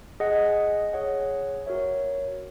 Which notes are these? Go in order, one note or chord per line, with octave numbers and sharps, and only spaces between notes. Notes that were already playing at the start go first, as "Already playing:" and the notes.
G#4 D#5 F#5
G#4 C#5 F#5
F#4 A#4 C#5 E5